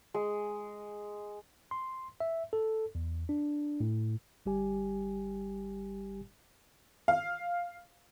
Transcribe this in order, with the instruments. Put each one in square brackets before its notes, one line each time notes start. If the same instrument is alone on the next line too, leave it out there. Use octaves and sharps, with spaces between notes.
[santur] G#3
[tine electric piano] C6
E5
A4
E2
D4
A2
G1 G3 G4 G#5
[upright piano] F5